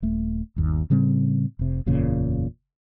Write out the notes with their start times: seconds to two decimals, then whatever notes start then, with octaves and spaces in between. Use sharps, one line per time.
0.02 D#1 A3
0.56 G1 D#2
0.90 A2 C#3 G3 C4
1.59 F1 C3
1.86 F#1 E2 A#2 C#3